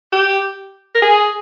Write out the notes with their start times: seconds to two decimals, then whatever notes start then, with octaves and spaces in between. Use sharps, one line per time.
0.12 G4
0.95 A#4
1.02 G#4